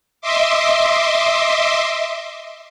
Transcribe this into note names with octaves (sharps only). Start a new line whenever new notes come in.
D#5 E5 C6 D6